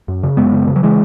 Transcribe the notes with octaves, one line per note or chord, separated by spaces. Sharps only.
F#2
C#3
F#2 G#3 B3
C#3
C#3
F#3
E3 G#3